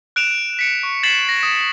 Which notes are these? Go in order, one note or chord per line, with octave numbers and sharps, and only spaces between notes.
F#6 D7 E7 F7
B6 C#7 D7
C#6
G#6 A6 B6 C7 E7 F#7
A#6
D#6